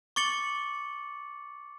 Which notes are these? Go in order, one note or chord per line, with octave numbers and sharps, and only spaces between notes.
C#6 D6 A6 C#7 F#7